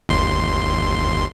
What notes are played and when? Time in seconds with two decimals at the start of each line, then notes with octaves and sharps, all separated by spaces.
0.09 G1 D#2 C6